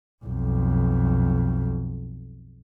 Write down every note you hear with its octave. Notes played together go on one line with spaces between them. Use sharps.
B1 F2